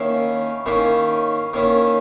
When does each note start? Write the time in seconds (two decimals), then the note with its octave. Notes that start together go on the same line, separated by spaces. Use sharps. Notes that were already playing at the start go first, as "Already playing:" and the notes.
Already playing: D#3 A#3 C#4 E4
0.66 D#3 A#3 C#4 E4
1.53 D#3 A#3 C#4 E4